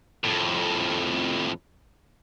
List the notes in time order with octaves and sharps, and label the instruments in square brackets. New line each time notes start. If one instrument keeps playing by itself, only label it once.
[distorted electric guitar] F2 A2